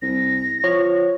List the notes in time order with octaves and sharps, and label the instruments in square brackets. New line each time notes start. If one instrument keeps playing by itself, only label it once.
[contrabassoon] C2 [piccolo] A#6
[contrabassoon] F3 [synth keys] C#5